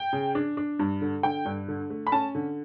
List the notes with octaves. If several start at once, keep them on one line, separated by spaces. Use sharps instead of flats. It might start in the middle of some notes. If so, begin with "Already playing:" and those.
Already playing: G5
C#3
D4
D4
G2
D3
D3 G5
G2
D3
A3
B5
C#4 A5
D3